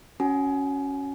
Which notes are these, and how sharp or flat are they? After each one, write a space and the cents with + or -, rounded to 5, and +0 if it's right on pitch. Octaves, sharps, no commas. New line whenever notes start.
C#4 +0 F#4 +0 G#5 +25